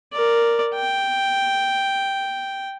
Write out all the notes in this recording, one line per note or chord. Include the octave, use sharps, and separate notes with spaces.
A#4 D5
G5